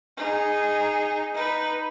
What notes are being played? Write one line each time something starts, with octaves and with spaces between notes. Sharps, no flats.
D#4 G#4
D#4 B4